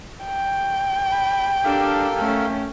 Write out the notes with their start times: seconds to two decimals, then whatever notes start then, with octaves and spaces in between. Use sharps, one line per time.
0.25 G5
1.12 B5
1.65 D4 G4 A4 A#4 F5
2.18 A3 C#4